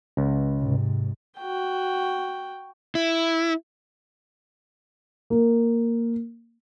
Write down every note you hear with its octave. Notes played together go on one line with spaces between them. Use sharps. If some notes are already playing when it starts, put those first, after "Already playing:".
C#2
G#2 C3
F#4 G5
E4
A#3